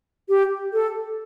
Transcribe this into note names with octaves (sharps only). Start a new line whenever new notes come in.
G4
A4